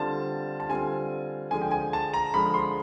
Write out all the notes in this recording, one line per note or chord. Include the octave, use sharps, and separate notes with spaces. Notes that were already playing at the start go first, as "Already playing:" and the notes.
Already playing: D3 G3 C4 F4 A5
A5
D3 G3 C4 F4 G#5
D3 F3 G#3 G#5
G5
G#5
A5
A#5
D3 F3 G#3 B5
C6